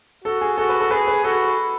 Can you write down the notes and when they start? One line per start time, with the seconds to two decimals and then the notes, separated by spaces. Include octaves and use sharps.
0.24 F#4 A4
0.41 G#4
0.58 F#4 A4
0.69 B4
0.81 A4
0.91 G#4 B4
1.07 B4
1.24 F#4 A4